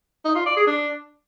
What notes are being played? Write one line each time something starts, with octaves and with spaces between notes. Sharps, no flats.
D#4
F4
D5
G#4
D4